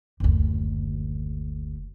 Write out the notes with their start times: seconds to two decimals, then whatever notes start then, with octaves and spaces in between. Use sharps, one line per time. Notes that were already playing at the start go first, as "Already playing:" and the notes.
0.20 F#1 D2